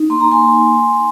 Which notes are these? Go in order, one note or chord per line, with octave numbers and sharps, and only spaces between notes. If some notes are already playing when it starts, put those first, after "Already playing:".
Already playing: D#4
A#3 C6
A#5
G#5 C6